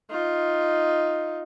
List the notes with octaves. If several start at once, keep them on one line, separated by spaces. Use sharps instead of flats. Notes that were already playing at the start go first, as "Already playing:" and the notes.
D#4 F4